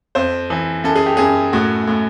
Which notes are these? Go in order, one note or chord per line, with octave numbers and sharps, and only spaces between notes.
F2 C5
E3
F#2 A4
G#4
G4
F#2 G#4
A2 F#4
A2